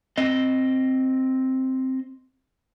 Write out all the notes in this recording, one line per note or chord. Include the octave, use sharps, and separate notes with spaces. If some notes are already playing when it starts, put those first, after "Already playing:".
C4 D#5